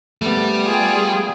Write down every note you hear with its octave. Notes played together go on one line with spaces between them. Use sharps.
G3 A3 B3
F4 G#4 G5